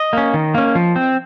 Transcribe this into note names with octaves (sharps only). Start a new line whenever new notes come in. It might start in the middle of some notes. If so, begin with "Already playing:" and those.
Already playing: D#5
A#3 C#4
D#3
A#3 C#4
F3
C4